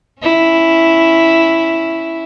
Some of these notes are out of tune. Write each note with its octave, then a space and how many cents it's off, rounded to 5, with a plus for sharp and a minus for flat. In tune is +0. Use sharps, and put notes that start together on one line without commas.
C#4 +0 E4 +0